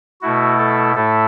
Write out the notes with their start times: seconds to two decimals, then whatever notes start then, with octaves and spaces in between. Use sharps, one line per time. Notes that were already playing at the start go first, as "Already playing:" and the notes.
0.21 B2 A3 E4 F#4
0.58 A4
0.95 A2 A3 E4 A4